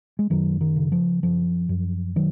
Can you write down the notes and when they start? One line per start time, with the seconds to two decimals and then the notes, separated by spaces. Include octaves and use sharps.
0.19 G#3
0.30 F#2 D#3 F#3
0.61 D#3
0.76 C#3
0.92 F3
1.23 F#2 F3
1.69 F#2
2.16 D#3 F#3